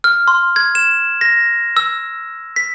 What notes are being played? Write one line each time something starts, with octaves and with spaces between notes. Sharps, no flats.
F6
C6
G#6
E7
A#6
E6
B6